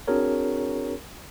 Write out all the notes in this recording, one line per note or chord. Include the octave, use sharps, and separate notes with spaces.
C4 D4 F#4 G#4 A#4 C#5